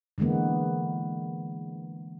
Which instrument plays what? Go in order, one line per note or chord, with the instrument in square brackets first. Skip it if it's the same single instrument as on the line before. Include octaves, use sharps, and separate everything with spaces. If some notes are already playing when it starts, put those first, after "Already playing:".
[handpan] D3 E3 G#3 A#3 B3